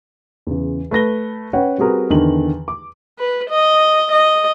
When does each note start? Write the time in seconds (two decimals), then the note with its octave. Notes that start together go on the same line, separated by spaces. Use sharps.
0.47 E2 C#3
0.91 A3 B4 A#6 G7
1.53 C#4 B4 C#5 F#5 G5
1.78 G3 C4 F#4 G#4 A#4 B4
2.10 E2 D3 D#3 F#7
2.68 D6
3.19 B4
3.50 D#5
4.12 D#5